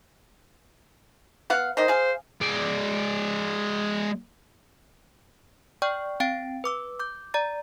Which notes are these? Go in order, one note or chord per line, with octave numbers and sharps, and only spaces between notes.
B3 F5 F#5
D#3 C5 D#5
G#4 F5
G#3 D5
D5 G5 C#6 F6
C4 F5 G5 A6 D7
B4 D6 E6
D6 G6
D5 A#5 A6